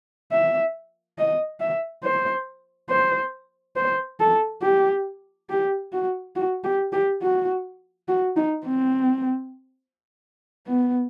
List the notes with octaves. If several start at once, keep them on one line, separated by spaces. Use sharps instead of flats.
E5
D#5
E5
C5
C5
C5
A4
G4
G4
F#4
F#4
G4
G4
F#4
F#4
D#4
C4
B3